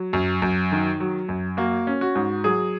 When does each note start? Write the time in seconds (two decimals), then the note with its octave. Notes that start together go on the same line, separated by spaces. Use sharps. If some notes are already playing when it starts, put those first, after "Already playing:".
Already playing: F#3
0.13 F#2
0.42 F#2
0.72 D#3
1.00 F#3
1.29 F#2
1.57 A#3 F#4
1.87 C#4
2.01 F#4
2.16 G#2
2.44 F#3 G#4